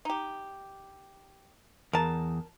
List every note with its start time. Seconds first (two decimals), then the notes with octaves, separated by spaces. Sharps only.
0.05 D#4 G4
1.93 E2 A#4 A5